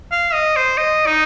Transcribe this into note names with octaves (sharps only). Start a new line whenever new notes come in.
F5
D#5
C5
D#5
D#4